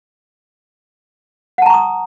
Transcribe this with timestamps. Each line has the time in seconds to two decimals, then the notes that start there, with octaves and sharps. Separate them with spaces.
1.58 F#5
1.62 A5
1.66 A#5
1.70 C#6
1.74 D#6